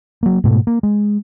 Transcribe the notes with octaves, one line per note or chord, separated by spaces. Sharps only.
F#3 A#3
G#2 B2 A3
A#3
G#3